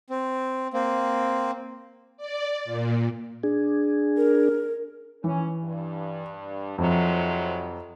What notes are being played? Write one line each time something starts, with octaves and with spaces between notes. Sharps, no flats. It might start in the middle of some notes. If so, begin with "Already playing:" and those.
C4
A#3 C4
D5
A#2
D4 G#4
A#4
E3 C#4
G2
F2 G#2 C3 F#3